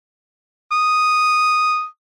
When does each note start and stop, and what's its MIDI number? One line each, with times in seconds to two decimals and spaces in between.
0.72 1.85 87